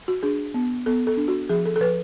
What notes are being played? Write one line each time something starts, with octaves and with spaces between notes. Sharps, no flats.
F#4
D4 G#4
B3
B3 A4
A4
D4
F#4
F3 G#4
A4
A4
F3 B4